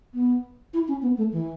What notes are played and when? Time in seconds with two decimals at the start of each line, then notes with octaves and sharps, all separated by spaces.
0.14 B3
0.74 E4
0.88 C#4
1.02 B3
1.17 A3
1.32 E3